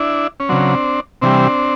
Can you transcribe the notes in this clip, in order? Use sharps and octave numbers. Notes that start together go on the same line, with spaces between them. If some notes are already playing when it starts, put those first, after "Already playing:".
Already playing: D4 E4
C#4
C#3 F#3 C4 D4
C3 E3 G3 C4 D4